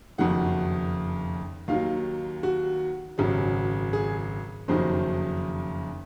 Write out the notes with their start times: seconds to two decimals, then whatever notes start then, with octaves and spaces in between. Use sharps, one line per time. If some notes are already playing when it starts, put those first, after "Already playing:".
0.18 F#1 F2 D#3 F#3 F#5
1.68 D#2 D#3 F#3 F5
2.43 F#4
3.18 G#1 F#2 C#3 F#3
3.93 G#4
4.68 F#1 F2 D#3 F#3 C5